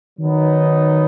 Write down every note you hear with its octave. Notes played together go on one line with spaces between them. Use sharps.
D#3 F#3 B3 D#4